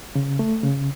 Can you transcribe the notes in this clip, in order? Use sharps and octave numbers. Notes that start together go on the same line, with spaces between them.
C#3
A3
C#3